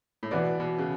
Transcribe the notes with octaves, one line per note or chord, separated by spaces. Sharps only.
A2
B2 E3 B3 E4 B4 D5
B2
C#3